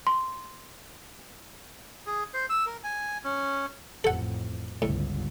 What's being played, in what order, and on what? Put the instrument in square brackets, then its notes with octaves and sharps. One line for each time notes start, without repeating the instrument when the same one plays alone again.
[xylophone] C6
[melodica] G#4
C5
E6
A#4
G#5
C#4
[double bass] A1 F2 [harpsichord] A4 F#5
[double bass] G1 C#2 [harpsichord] A2